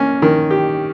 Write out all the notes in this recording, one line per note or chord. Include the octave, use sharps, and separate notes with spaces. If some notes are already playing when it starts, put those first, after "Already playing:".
Already playing: A#3 C#4
D#3
G4